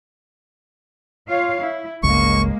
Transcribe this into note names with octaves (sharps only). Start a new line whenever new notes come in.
F4 C#5 F5
E4
G1 C#2 G#3 A#3 C#6